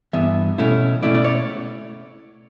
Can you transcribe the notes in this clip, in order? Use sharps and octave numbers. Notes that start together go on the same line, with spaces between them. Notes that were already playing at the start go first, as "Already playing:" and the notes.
G2 E3 B3 E5
B2 A3 C#4 E4
B2 A3 C#4 E4 D5
D5
C#5